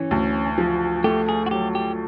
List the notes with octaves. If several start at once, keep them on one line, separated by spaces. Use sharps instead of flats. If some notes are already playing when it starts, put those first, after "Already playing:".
Already playing: E3 C#4
D2
F3
A3 G4
G#4
F#4
F#3 G4
G4